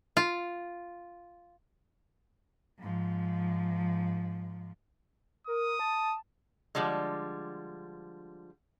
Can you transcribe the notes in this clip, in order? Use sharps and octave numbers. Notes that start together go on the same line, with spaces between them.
F4
G#2 F3
A#4 D#6
A5
D3 F3 G3 G#3